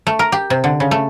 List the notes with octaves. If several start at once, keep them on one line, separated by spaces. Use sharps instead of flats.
A3
A#4
G4
C3
D3
C#3
A3